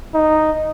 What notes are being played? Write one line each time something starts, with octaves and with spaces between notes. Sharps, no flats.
D#4